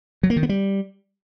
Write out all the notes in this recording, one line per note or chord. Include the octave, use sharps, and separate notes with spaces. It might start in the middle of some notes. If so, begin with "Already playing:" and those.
F#3
A#3
D#3
B3
G3